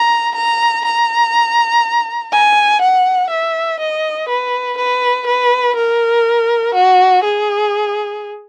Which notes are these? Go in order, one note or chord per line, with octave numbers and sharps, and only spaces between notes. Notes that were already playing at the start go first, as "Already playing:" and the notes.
Already playing: A#5
A#5
A#5
G#5
F#5
E5
D#5
B4
B4
B4
A#4
F#4
G#4